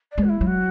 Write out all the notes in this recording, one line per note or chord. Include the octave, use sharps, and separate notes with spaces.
D5
G#3
F#4
E4
F#3
F#4